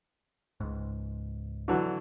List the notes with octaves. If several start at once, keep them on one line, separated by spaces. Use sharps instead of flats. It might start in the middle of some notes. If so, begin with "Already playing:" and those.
C#2 G#2
D3 E3 F#3